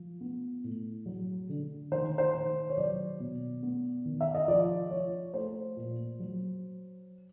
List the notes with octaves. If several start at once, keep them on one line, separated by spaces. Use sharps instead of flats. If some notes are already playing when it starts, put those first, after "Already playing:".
Already playing: F3
B3
A2
F#3
D3
D#3 C5
C5
D#3
C#5
F#3 D5
B2
B3
D#3
E5
D#5
F3 D5
F3 C#5
A3 C5
A#2
F#3